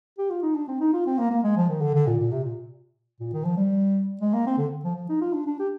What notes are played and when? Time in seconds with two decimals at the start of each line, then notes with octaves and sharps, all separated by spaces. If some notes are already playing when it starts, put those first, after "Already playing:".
0.18 G4
0.30 F4
0.43 D#4
0.55 D4
0.68 C4
0.81 D#4
0.93 F4
1.06 C4
1.19 A#3
1.31 A#3
1.44 G#3
1.57 F3
1.69 D#3
1.82 D3
1.95 D3
2.07 A#2
2.20 A#2
2.32 C3
2.44 A#2
3.20 A#2
3.33 D#3
3.45 F3
3.57 G3
4.21 G#3
4.33 A#3
4.46 C4
4.58 D3
4.84 F3
4.96 F3
5.09 D#4
5.21 F4
5.33 D4
5.47 D4
5.60 G4